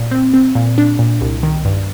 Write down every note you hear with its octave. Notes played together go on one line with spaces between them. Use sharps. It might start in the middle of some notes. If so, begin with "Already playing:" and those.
Already playing: A#2
C4
C4
A#2
D4
A#2
C2
D#3
G2